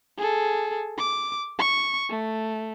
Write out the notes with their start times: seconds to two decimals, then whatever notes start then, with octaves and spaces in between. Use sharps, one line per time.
0.18 G#4 A4
0.98 D6
1.59 C#6
2.10 A3